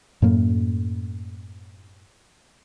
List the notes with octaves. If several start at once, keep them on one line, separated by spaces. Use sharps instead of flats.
F#2 A2 A#3